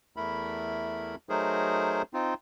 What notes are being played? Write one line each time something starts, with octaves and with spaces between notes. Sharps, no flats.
E2 A3 E4 A#4 B5
F#3 A3 D#4 G#4 A#4 C5
C4 D#4 F4